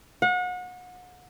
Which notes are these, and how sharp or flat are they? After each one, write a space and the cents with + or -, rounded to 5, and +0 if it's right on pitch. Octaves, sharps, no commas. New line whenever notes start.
F#5 -35